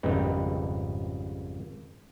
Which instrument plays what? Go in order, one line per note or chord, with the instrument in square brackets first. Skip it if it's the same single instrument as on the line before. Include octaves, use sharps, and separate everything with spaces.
[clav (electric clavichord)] G#1 F2 C#3 G3 D#4 B4